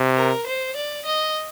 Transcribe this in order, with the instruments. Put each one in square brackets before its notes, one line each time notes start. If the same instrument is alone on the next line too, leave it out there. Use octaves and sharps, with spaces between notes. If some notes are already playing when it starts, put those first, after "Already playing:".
Already playing: [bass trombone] C3
[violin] A#4
C5
D5
D#5